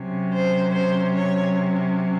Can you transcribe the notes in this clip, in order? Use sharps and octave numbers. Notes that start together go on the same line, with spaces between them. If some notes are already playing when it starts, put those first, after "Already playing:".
Already playing: C3 F#3 C#4
C5
C5
C#5